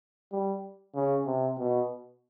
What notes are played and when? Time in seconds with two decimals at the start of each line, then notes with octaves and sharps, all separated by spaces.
0.32 G3
0.95 C#3
1.26 C3
1.58 B2